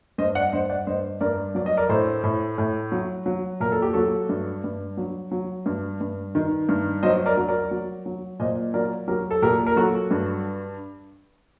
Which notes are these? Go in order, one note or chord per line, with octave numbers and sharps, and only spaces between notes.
G2 C5 D#5
D5 F#5
G2 C5 D#5
D5 F#5
G2 C5 D#5
G2 A#4 D5
F#3 D5
D#5
A#4 D5
A2 A4 C5
A2
A2
F#3
F#3
A#2 A#4
A4
G4
F#3 F#4 A4
G2
G2
F#3
F#3
G2
G2
D#3
G2
F#3 C5 D#5
A#4 D5
F#3
A#4 D5
F#3
F#3
A#2 C5 D#5
F#3 A#4 D5
F#3 G4 A#4
A4
A#2 G4 A#4
A#4
F#3 F#4 A4
G2